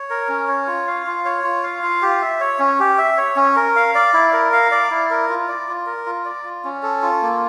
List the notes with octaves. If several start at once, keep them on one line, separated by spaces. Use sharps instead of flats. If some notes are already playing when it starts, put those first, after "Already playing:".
Already playing: C#5
A#4
C#4
C#5
F4
F5
F4
C#5
F4
F5
F4
G4
E5
C#5
C#4
G4
E5
C#5
C#4
A#4
F5
D5
E4
A#4
F5
D5
E4
A#4
F4
D5
F4
A#4
F4
D5
F4
C#4
A4
F4
A#3